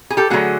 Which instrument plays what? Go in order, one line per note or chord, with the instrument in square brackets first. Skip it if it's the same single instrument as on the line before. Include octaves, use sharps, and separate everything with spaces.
[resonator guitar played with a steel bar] G#4
G4 A4
D3 F#3 A3 F#4 G#4